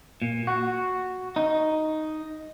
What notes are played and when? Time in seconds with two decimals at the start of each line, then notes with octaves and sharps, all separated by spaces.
0.22 A#2
0.47 F#4
1.36 D#4